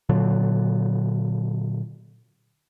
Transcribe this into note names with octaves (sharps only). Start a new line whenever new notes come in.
A#2 D3 F#3